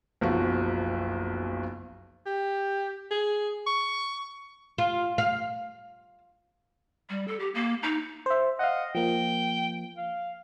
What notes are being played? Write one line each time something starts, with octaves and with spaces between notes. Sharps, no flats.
F#1 B1 F3 F#4
G4
G#4
C#6
F4
F5
G3
A4
G4
A#3
D#4
C5 E5
D#5 F5 F#5
F3 A#3 G5
F5